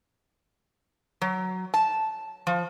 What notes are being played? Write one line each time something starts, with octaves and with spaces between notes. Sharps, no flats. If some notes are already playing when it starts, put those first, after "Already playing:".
F#3
A5
F3